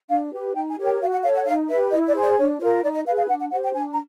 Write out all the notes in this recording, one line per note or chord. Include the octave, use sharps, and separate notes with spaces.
D4 F5
G4 B4
D#4 G5
G#5
G4 A#4 C#5
G5
F#4 F5
F#5
A4 C#5 F5
F#5
D#4 F5
G4 B4 E5
E4 D#5
D5
G#4 C5
D5
D4 C#5
F4 A#4 C#5
D#4 D5
D#5
G#4 B4 F5
F5
D4 F#5
F#5
G4 C5 F#5
G5
D4 G#5
A#5